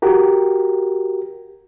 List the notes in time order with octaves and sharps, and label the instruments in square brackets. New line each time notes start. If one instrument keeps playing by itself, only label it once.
[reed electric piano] F#4 G4 A#4